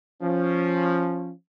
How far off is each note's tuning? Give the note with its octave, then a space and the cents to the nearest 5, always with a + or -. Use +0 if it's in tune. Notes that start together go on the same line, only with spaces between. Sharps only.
F3 +0 C#4 -10